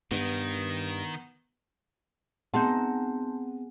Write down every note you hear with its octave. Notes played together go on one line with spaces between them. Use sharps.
G2 D#3 B3
B3 C4 D#4 G#4 F#5 A5 C6 G6